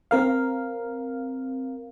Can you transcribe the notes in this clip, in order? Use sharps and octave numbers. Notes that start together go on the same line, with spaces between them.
C4 A#4 F5